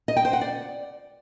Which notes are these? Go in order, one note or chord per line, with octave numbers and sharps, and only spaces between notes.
D#5
G5
C5
F#5
D5